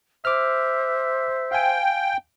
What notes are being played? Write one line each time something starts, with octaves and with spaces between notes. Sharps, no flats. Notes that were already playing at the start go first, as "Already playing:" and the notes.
C5 E5 D6 F6
F5 G5 G#5